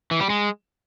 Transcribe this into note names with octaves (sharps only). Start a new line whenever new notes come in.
E3
G3
G#3